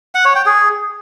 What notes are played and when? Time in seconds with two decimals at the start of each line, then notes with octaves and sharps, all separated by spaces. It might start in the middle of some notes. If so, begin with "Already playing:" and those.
0.15 F#5
0.25 C#5
0.35 G5
0.46 G#4